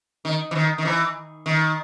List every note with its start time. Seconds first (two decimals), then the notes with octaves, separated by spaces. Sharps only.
0.25 D#3
0.51 E3
0.56 D#3
0.78 D#3
0.85 E3
1.46 D#3